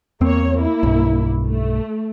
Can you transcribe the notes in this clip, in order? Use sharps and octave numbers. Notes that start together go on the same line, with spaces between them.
E2 A#3 C4 C#5
A#3 E4
B1 G2
A3